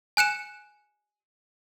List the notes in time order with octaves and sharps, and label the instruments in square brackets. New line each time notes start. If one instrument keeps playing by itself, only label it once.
[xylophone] G#5 F#6 C#7 E7